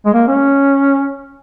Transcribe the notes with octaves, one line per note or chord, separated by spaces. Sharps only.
G#3
A#3
C#4